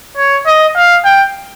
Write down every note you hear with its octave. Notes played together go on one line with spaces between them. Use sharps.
C#5
D#5
F5
G5